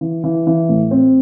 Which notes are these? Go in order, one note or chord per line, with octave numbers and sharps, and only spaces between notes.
E3
E3
E3
A2
C4